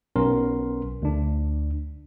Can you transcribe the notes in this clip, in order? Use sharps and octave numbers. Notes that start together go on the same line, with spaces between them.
B1 B3 C#4 A#4 C6
D2 D4